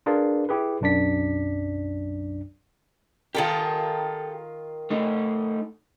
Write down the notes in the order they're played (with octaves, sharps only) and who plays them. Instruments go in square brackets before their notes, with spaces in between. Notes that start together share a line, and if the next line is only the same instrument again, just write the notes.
[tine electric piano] D4 F4 G#4 A#4 B4 D5
E4 G4 G#4 B4
B1 F#2 D4 D5 B6
[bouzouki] D#3 F4 A#4 [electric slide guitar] G4 A4
[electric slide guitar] A3 D#4